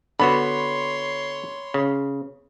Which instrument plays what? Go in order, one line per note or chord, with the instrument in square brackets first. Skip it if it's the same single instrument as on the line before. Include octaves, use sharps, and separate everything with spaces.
[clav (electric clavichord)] D3 B3 F#4 [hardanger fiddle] C#5 C6 [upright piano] B5
[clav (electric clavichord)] C#3